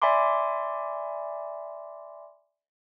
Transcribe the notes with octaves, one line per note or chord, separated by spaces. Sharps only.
D5 E5 G#5 B5 C6 D6